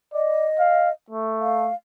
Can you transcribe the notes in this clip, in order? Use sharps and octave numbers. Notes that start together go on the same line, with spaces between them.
D5 D#5
F5
A3
F5